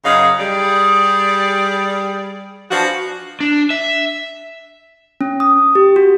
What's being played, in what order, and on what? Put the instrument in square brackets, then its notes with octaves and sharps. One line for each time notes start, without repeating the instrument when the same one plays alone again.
[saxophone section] F#2 C#3 D#4 G#4 C#5 F5
G3 G#4 D5
E3 F3 D4 F#4
[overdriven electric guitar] D4
E5
[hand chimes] C#4
D#6
G4
F#4